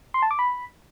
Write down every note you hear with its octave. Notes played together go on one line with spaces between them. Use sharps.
C6
A5
D6
B5